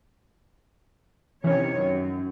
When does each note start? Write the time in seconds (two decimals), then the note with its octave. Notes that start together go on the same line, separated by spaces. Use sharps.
1.44 C3 D#3 E3 C#4 C#5
1.77 F#2